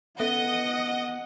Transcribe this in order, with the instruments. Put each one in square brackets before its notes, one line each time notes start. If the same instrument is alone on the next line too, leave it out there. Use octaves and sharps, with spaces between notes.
[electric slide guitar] B3 [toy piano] C#4 A4 E5 [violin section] D#5 [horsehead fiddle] F#5